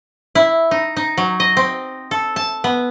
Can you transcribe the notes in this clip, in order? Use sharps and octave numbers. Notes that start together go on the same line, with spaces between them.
E4
D#4
D#4
F#3
D#5
C4
A4
A5
B3